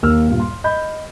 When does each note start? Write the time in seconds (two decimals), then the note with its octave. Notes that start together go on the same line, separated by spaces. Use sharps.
0.02 D#2 A#3 E6 F6
0.28 G2 A#2
0.40 C6
0.64 D#5 B5 G6